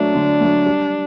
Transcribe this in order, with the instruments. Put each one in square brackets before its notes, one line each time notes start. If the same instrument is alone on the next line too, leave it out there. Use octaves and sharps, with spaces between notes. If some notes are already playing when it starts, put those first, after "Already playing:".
Already playing: [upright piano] F#3 A3 [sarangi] D4
[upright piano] D3
F#3 A3
G3